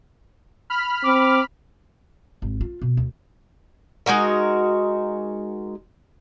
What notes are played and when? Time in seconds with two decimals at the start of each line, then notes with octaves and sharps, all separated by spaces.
0.70 B5 F6
1.04 C4 D6
2.42 G#1
2.61 F4
2.82 B2
2.97 D2
4.06 G#3 D#4 F#4 A#4